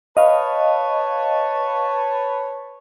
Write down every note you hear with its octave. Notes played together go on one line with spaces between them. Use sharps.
B4 C#5 D#5 F5 A5